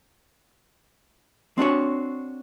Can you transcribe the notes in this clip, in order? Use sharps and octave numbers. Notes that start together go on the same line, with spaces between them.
C4 D4 F#4 C#5